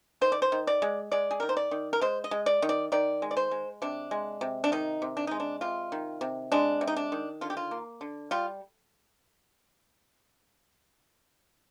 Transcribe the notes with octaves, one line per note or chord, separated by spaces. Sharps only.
D#3 C5
D5
C5
D#3
D5
G#3
G#3 D5
G#4
D#3 A#4
C5
D5
D#3
A#4
G#3 C5
D#5
G#3
D5
D#3
D5
D#3 D5
G#3
D5
C5
G#3
C3 D4
G#3
C3
D4
D#3 D#4
C3
D4
G#3 D#4
D4
C3 F4
D#3
C3
G#3 D4
C3
D#4
D4
D#3
D3 F4
G4
F4
A#3
D3
G3 F4